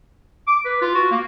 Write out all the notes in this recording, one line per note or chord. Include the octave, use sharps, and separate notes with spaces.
D6
B4
F4
F#4
A#3